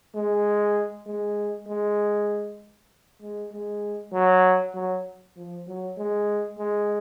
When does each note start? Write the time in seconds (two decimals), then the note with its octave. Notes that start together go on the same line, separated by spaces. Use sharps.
0.15 G#3
1.06 G#3
1.67 G#3
3.21 G#3
3.52 G#3
4.13 F#3
4.74 F#3
5.37 F3
5.67 F#3
5.97 G#3
6.59 G#3